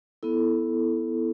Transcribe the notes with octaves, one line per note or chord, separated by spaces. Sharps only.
B3 E4 A4